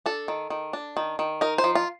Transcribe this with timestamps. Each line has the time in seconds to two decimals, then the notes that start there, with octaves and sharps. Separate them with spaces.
0.06 D4 A4
0.28 D#3
0.50 D#3
0.73 D4
0.97 D#3
1.19 D#3
1.41 D#4 A#4
1.58 C5
1.64 F3
1.75 F4